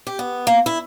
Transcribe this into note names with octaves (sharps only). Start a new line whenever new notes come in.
G4
B3
A#3
E4